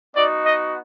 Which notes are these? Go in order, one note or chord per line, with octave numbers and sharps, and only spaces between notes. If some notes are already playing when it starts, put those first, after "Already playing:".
B3 D#4 F#4 D5
D#5